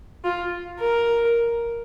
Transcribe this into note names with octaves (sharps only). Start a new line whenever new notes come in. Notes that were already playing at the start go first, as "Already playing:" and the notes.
F4
A#4